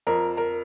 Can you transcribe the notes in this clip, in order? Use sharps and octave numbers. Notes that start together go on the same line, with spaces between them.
F2 A#4 A#5
A#4 A#5